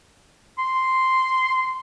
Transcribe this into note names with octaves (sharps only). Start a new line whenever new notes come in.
C6